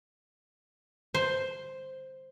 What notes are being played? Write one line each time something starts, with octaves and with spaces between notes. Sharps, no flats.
C5